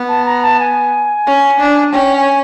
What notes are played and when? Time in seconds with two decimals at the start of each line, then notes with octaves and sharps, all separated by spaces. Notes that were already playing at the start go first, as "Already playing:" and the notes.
Already playing: B3
0.08 A5
0.26 A#5
0.42 A5
0.60 G#5
1.27 C#4
1.60 D4
1.93 C#4 G5
2.16 G#5